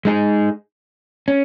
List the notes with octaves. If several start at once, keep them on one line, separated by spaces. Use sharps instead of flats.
G#3 D#4 G#4
C#4